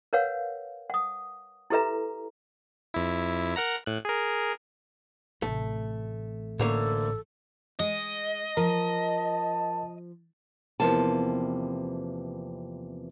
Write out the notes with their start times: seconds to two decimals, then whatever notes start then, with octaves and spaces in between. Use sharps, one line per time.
0.13 A#4 B4 C#5 F5 F#5
0.90 F#5 D#6
1.70 E4 G4 A4 B4 E5 A#5
2.94 F2 E4
3.56 A#4 F#5 A#5
3.86 A2 F#6
4.05 G#4 A#4
5.42 A1 C3 A3
6.59 D2 A2 A#3 C#4 A4 C#5
7.80 G#3 D#5
8.57 F3 A#4 A5
10.80 E2 G#2 C3 F3 A#3 A5